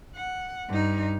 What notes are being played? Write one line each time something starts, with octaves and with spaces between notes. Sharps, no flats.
F#5
G2 D#4